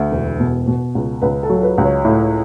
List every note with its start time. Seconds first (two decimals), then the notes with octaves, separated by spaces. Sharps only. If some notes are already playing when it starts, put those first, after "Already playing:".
Already playing: D2
0.12 E1
0.40 B2
0.68 B2
0.95 C#2
1.22 C#2 B4
1.43 A4
1.50 F#3
1.63 B4
1.78 C#2
1.85 C#5
2.04 A2 E4